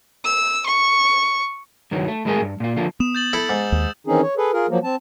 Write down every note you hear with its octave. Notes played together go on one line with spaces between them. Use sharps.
E6
C#6
G2 D#3 E3 F#3
A3
A2 G#3 E4 G#4 A#4 G#5
G2
A#2 F4
D3 F3 A#3 F4
B3 D#6 E7
G6 A6 F#7
E4 A4 E6
G#2
D#2
D#3 E3 C4 C#4 D#4 G#4
C#5
G#4 A4 B4
F4 G#4 A#4
F3 F#3 A#3
C4 A5